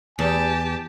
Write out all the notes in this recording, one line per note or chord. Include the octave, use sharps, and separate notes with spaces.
E2 G4 G#5 A5